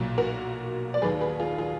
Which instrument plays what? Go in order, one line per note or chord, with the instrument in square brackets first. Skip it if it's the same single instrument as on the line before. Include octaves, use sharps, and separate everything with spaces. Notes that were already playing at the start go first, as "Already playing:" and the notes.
Already playing: [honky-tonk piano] B1 A#2 F#3
F#4 A#4
D5
D#2 D#3 F#3 G#4 B4
G#4 B4
F4 G#4
F4 G#4